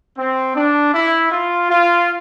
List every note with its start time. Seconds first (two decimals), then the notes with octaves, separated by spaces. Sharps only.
0.17 C4
0.55 D4
0.93 E4
1.32 F4
1.70 F4